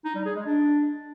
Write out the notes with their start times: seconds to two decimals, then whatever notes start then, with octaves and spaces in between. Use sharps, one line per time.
0.05 D#4
0.15 G3
0.26 G#4
0.36 G#3
0.46 D4